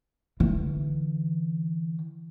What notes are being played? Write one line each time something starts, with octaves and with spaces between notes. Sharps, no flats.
D3 E3